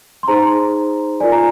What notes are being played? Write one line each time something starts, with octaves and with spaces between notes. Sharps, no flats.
C6
D#4 G#4 C5 A#5
F4 A#4 D5 G#5
A#5